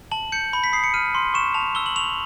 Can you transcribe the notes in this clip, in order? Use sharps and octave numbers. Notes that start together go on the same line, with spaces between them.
A5 F#7
G6 C#7
B5
B6
D#6 C7
C#7
F6 D#7
C6
C#6 E7
A5 F7
E6 G7
F#7
C#6 F7